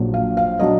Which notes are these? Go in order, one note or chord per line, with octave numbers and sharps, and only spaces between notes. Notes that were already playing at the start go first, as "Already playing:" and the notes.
Already playing: A#1 A#2 F#3 D4
F5
F5
F#3 D4 D#5